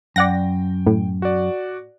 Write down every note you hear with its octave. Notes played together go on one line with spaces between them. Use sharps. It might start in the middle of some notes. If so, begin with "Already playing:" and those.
F#2 D5 F#5 G5 A#6
A2
F#4 D5